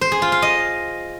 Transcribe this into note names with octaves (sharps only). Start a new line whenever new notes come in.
C5
G#4
F4
F5
D#5